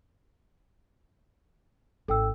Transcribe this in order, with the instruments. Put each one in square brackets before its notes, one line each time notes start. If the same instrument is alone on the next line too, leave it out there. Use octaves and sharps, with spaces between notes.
[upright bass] G#1 [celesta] A4 G5 E6